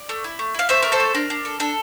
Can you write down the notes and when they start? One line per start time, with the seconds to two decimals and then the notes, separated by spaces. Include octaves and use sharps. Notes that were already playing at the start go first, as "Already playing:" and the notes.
Already playing: D5
0.09 A3
0.24 E4
0.39 A3
0.54 E4 F5
0.69 A3 C5 E5
0.82 A3 A#4
0.92 A4 C5
1.00 A3
1.15 D4 A#4
1.30 D4
1.45 A4
1.60 D4 A4